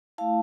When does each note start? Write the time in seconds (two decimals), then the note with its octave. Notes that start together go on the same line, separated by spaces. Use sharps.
0.18 A3 E4 F5 A5